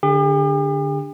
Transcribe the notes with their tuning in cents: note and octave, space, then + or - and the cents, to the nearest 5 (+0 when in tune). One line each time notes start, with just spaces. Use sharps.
D3 +0 G4 +45